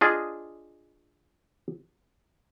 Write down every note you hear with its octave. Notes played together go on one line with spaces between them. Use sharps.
D4 F4 G#4 D#5